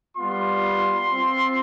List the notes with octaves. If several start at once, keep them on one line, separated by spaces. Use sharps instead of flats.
G3 B3 F4 C6
C4 F4